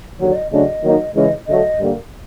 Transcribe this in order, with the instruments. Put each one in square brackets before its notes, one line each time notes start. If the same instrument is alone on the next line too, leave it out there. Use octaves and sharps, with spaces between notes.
[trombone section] D#2 D3 F#3 [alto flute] C#5
[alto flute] D5
D#5
[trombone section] C#3 F#3 A3 D4 [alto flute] D#5
[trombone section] D#3 F#3 A#3 D#4
[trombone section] C#2 C#3 E3 G#3 C#4 [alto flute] D#5
[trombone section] D3 F#3 A3 [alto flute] D#5
[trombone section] G2 D3 G3 A#3